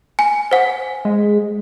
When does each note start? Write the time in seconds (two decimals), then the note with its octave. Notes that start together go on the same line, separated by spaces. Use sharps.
0.19 G#5
0.51 C5 F#5
1.05 G#3